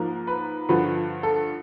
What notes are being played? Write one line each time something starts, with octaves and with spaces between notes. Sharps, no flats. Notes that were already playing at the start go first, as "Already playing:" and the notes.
Already playing: G#2 F3 A#3
B4
G2 D3 F3 B4
A4